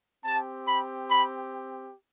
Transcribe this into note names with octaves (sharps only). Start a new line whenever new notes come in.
C4 G4 A5
B5
B5